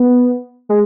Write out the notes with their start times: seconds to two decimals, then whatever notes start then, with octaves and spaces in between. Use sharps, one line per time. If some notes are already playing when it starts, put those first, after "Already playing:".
Already playing: B3
0.69 G#3